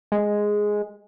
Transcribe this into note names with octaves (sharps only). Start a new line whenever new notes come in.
G#3